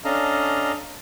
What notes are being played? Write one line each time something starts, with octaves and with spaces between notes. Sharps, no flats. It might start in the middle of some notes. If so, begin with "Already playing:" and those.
C#4 D4 A4 D#5 F5 A#5